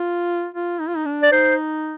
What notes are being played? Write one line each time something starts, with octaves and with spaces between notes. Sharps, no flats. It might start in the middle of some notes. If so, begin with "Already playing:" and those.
Already playing: F4
F4
D#4
F4
D#4
D4
D5
D#4 C5